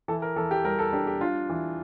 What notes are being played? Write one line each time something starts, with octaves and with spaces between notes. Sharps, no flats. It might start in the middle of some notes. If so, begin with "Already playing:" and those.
E3 A4
A#4
E3 A4
G4
G3 A#4
A4
D4 G4
G4
D4 F4
E3